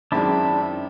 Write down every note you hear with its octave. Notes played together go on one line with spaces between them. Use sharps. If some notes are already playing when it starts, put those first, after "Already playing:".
F#2 D#3 G#3 C4 D4 E4